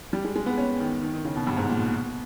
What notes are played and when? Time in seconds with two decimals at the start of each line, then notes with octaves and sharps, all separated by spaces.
0.13 G3
0.25 G#3
0.36 G#3
0.46 B3
0.57 C#4
0.80 D#3
1.02 D#3
1.13 D#3
1.25 C#3
1.36 B2
1.47 G2
1.57 G#2
1.69 A#2
1.80 B2